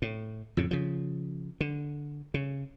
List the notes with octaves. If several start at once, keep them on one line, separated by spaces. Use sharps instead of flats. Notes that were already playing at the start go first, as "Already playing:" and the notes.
A2
F2 A2 C#3
C#3 F3
D3
C#3